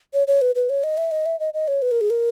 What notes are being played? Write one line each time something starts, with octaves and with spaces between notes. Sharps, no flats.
C#5
C#5
B4
B4
C#5
D#5
E5
D#5
E5
D#5
D#5
C#5
B4
A#4
G#4
A#4